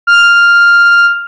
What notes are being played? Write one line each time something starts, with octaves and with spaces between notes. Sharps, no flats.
F6